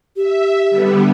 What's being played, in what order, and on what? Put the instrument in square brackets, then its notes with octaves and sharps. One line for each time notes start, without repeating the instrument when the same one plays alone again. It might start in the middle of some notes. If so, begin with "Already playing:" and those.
[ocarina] G4 [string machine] E5
[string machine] D3 G3 B3